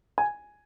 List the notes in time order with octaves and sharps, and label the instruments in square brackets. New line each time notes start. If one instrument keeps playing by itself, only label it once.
[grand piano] G#5